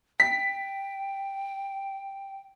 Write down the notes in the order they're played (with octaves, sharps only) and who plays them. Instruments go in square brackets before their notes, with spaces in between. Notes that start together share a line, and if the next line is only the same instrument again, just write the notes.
[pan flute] G5 [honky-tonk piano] B6